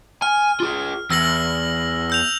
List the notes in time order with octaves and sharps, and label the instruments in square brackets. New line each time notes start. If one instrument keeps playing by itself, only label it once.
[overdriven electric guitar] G#5 [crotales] F6
[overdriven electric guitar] F4 G#4
[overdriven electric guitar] E2 [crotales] E6 A#6 F#7
[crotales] E6 G6 F7